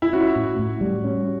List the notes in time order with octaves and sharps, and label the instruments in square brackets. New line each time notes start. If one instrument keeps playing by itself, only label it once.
[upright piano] E4
[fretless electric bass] C#4 [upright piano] F#4
[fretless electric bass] A2
A2
G3
C#4